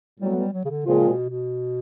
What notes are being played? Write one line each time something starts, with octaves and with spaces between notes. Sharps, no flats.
A2 F#3 G3 B3
G3
F#3
C#3
D3
A#2 C#3 F3 G#3 C4 F4
B2
B2